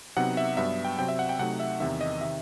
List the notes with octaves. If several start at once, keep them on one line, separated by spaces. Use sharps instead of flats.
C3 F#3 B3 D#4 F#5
E5
G2 F#3 B3 E5
G5
C3 F#3 C4 G5
E5
F#5
G5
C3 F#3 A3 D#4 F#5
E5
E2 C3 D#3 E5
D#5
C3 D#3 E5